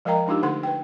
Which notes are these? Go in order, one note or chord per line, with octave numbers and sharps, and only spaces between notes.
F3 G#3 A#4 D#5 G5 A#5
G#3 D4 D#4 F4 G4
D3 A3 A4 F#5 C6
B4 G5